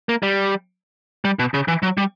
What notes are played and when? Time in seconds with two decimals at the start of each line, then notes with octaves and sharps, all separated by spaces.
0.09 A#3
0.23 G3
1.25 G3
1.39 B2
1.54 C#3
1.68 E3
1.83 F#3
1.97 G3